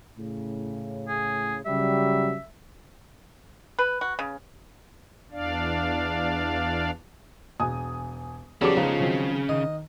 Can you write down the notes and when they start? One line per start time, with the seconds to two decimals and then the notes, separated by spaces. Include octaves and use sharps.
0.17 A2 C#3
1.08 G#4
1.66 C#3 F#3 G3 E5
3.79 B4
4.01 F#4
4.19 C#3
5.32 E2 D4 D5 F5
7.60 E1 G#5 D#6
8.61 E2 C#3 F#3 G3 A4 D6
8.77 C#2 F3 B3 D#4 G4
9.00 D#3 F#3 C4
9.49 D#3 D#5